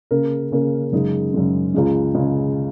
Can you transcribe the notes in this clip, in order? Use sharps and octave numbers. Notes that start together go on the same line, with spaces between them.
C#3 A#3 C#4 A#4
C#3 A#3 C#4 A#4
F#2 C#3 G#3 D#4
F#2 C#3 G#3 D#4
C#2 C#3 G#3
C#2 C#3 G#3